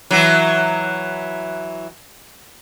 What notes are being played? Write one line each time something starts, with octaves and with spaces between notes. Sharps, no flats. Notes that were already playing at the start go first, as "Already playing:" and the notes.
E3 F#3